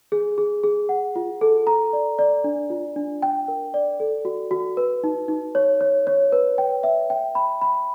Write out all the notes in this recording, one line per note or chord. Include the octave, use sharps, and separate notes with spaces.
G#4
G#4
G#4
F#5
F4
A4
A#5
D5
D5
D4
F4
D4
G5
A#4
D5
A4
F#4
F#4
B4
D#4
D#4
C#5
C#5
C#5
B4
G5
E5
G5
B5
B5